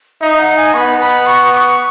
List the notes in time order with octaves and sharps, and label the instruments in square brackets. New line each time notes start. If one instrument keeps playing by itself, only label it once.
[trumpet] D#4 [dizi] E5
[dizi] F#5
G#5
[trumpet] B3 [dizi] B5 C#6
[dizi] B5
C#6
D#6
C#6